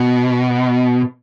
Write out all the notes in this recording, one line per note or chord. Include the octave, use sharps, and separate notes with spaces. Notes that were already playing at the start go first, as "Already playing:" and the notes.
Already playing: B2